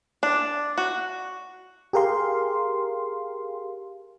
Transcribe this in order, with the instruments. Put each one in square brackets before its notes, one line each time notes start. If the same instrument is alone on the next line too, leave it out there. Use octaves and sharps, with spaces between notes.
[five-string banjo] D4
F#4
[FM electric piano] G4 G#4 A#4 F5 C6